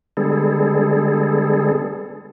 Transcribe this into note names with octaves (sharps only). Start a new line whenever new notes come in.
D3 G3 G#3 B3 G#4 A4